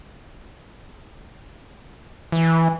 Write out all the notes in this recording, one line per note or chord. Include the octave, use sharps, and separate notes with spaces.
E3